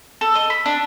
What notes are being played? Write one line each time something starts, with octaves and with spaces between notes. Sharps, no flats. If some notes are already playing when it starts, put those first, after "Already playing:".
A4
D#5
B5
D4